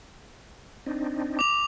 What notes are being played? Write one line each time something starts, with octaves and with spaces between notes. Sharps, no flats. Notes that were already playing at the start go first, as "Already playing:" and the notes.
C4 D4 D#4
D6 F7